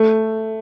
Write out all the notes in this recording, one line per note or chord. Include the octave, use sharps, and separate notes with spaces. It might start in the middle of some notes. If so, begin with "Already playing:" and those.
Already playing: A3